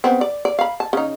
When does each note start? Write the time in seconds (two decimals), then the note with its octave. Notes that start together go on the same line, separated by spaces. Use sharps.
0.04 C#3 B3 C4
0.21 D5
0.45 D5
0.59 F5 B5
0.80 A5
0.93 C#3 D#4